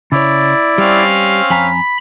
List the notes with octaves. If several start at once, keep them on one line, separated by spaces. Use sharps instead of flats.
C#3 E4 C#5 D5
G3 C4 C#4 F5
F2 G#5 A#5 B5